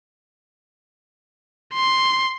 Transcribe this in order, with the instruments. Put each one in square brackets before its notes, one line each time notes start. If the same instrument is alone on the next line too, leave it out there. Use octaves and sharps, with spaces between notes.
[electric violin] C6